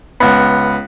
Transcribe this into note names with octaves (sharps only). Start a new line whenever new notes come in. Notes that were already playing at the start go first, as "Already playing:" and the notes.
C#2 B3